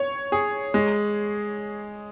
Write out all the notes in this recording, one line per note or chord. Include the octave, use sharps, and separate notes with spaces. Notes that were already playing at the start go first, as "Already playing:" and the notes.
Already playing: C#5
G#4
G#3